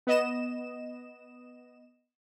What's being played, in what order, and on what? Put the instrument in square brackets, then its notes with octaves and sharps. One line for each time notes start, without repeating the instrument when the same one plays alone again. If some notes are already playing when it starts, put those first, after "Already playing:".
[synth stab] B3 D#5 E7